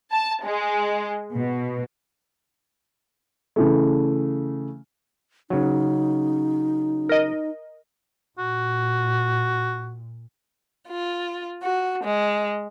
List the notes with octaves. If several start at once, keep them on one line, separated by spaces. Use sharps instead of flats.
A5
G#3
B2
C#3 E3 A3
C#3 F#3 D#4
A#4 D#5
A#2 F#4
F4
F#4
G#3